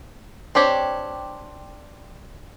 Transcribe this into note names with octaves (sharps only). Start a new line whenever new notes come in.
C4 D4 G4 C#5